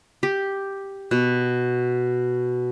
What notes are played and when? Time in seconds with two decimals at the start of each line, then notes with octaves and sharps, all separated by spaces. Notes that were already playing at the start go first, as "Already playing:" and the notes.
0.23 G4
1.11 B2